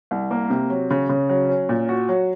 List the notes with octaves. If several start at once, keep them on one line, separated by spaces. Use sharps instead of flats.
C2
A#3
C3
F#3
C#3
C#3
F#3
C#4
A#2
F#4
F#3